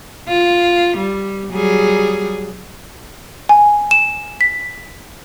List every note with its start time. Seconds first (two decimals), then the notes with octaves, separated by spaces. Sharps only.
0.28 F4
0.97 G3
1.52 F#3 G3 G#4
3.49 G#5
3.91 E7
4.41 B6